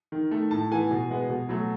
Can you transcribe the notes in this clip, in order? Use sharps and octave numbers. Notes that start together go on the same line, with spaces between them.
D#3
A3
A2 A5
E3 B3 G#5
B2
G#3 B3
B2
F#3 A3